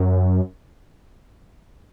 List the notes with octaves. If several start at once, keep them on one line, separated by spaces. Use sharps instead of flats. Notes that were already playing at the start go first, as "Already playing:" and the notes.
Already playing: F#2